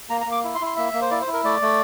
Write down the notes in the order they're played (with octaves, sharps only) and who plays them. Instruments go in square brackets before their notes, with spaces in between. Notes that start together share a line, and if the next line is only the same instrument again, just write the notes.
[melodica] A#3 A#5
A#5
A#3
D6
E4
C6
E4
C6
A#3 E5
A#3
C5
E4 D5
C5
E4
A#4
A3 D5
A3